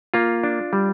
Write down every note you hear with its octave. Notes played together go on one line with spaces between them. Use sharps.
A#3 F4
D4
G3